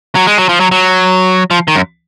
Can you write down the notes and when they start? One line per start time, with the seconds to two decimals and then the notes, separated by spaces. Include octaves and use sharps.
0.15 F#3
0.27 G#3
0.38 F#3
0.49 F3
0.60 F#3
0.72 F#3
1.51 F3
1.68 D#3
1.75 F#2